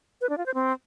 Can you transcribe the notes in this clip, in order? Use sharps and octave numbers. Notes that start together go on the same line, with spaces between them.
B4
D4
F4
C5
C4